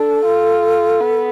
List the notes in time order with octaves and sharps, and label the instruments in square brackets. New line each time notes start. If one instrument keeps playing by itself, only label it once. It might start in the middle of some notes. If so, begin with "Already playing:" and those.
Already playing: [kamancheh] D4 [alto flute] A4
[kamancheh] F4
B3